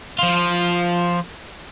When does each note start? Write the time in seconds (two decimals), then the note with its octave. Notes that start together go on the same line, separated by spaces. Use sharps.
0.19 F3 F4